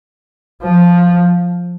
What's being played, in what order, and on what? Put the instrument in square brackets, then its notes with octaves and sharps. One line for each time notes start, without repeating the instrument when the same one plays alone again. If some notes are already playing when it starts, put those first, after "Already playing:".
[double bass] F3